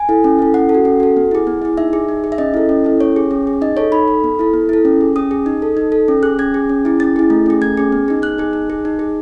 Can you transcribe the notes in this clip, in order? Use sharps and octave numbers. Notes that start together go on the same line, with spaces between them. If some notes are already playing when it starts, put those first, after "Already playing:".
Already playing: G#5
E4 A4
C#4
E4 A4
C#4 F#5
A4
F#4
C#4
F#4 A4
B3
E4 G#4
B3
E4 G#4
D#4 E5
G#4
D#4
G#4
E5
C#4 D#5
E4 A4
C#4
E4 A4
C#4 C#5
G#4
C#4
G#4
D#4 D#5
A4 C#5
D#4 B5
A4
B3
E4 A4
B3
E4 A4
C#4
G#4
C#4 D#6
G#4
D#4
A4
D#4
A4
C#4
G#4 F#6
C#4 G#6
G#4
C#4
E4 G#4
C#4 A6
E4 G#4
A3
C#4 G#4
A3 G#6
C#4 G#4
B3
D#4 G#4
B3 F#6
D#4 G#4
D#4
G#4
D#4
G#4